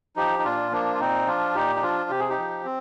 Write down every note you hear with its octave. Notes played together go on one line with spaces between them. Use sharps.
F3 D#4 G4
D#4
A#2 D4 F4
F3 A#3 D4
F4
A#2 C4 D#4
F3 D4 F4
A#2 D#4 G4
D#4
F3 D4 F4
C3 G4
G#4
D#4 G4
F3
C4